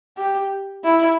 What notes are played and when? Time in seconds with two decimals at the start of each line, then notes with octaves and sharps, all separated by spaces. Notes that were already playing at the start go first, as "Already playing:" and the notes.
0.17 G4
0.84 E4